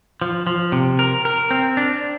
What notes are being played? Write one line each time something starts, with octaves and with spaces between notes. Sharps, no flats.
F3
F3
C3
A#4
A#4
C4
D4